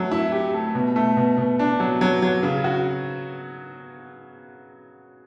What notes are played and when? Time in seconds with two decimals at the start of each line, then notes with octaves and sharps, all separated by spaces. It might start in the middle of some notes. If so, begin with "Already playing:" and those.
Already playing: F#3 A3
0.11 E4
0.32 G4
0.54 A3
0.75 B2
0.96 A3
1.17 B2
1.38 B2
1.59 D4
1.80 F#3
2.01 F#3
2.22 F#3
2.43 C#3
2.64 F#4